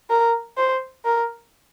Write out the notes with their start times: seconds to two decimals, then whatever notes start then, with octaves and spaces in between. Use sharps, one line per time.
0.10 A#4
0.57 C5
1.05 A#4